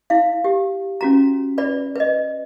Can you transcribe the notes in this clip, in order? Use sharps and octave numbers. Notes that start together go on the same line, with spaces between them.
E4 F5
G4
C#4 F#4 A#5
B4 D5 B5
B4 D#5